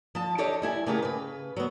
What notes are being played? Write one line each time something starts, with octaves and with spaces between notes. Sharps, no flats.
F3 A5
D4 G4 A4 C#5 D#5
G3 E4 G#5
C#3 A3 G4 G#4 A#4
C#3 B4
F#3 B3